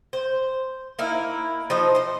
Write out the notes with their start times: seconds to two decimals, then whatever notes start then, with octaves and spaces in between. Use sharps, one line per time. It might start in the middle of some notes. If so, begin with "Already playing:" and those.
0.13 C5
0.99 A#3 D#4 E4 A#4
1.70 F3 D#4 C5 D#5
1.95 C5 D#5